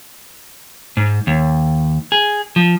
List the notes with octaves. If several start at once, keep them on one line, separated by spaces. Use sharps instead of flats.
G#2
D#2
G#4
F3